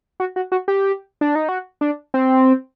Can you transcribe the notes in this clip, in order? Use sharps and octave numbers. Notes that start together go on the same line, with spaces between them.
F#4
F#4
F#4
G4
D4
D#4
F#4
D4
C4